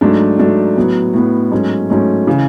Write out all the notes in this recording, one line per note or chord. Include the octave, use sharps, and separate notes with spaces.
G#2 F#3 A3 D4
G#2 F#3 A3 D4
A2 F#3 B3
A2 F#3 B3
G#2 F#3 A3 C#4
G#2 F#3 A3 C#4
C#3 E3